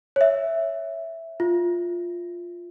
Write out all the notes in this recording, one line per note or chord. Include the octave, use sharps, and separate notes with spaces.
C#5
E5
F4